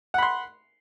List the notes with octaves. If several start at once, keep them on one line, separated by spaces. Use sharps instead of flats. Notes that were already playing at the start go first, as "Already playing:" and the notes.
F#5 B5 C6